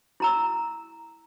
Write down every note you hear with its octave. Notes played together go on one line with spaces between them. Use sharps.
E4 A#5 E6